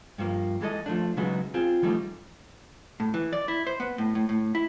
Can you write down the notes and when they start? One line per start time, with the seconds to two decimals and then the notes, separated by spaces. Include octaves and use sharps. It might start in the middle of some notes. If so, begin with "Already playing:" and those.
0.18 G2 F3 A3 A#3
0.61 E3 G#3 A4 D#5
0.86 F3 A3 D4
1.17 C#3 F#3 G#3 B3 D#4 F#4
1.54 C4 F4 G#4
1.82 E3 F3 G3 A3 D#4
3.00 A2
3.14 E3
3.33 D5
3.48 E4
3.67 C5
3.80 B3
3.98 A2
4.15 A2
4.29 A2
4.55 E4